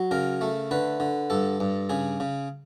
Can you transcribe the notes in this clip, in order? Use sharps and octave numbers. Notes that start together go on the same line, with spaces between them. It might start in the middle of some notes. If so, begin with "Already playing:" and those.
Already playing: F#3
C#3 A#4
A3
D3 B4
D3
G2 A4
G2
C#3 G#4
C#3